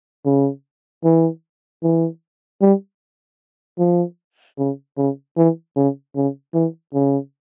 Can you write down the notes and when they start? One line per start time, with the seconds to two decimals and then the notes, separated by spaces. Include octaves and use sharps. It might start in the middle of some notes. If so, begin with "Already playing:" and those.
0.26 C#3
1.04 E3
1.83 E3
2.61 G3
3.79 F3
4.59 C#3
4.97 C#3
5.37 E3
5.76 C#3
6.16 C#3
6.54 E3
6.94 C#3